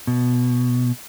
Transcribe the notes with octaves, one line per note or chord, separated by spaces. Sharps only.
B2